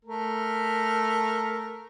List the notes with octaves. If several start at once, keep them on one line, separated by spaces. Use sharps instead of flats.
A3 A#4